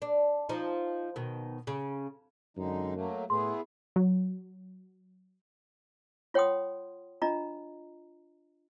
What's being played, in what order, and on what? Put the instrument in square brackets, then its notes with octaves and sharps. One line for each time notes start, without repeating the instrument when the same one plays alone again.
[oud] D4
F3 D#4
B2 D#3
C#3
[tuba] F#2 [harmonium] D3 G#3 D#4
[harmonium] F#3 A3 A#3
[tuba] A2 [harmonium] B3 E4 G#4 [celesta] C6
[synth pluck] F#3
[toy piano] F4 C#5 F#5 G5 C6 D#6
D4 F4 D#5 A#5